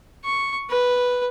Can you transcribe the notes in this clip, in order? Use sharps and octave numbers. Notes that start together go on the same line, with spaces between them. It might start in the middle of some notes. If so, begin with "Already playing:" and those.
C#6
B4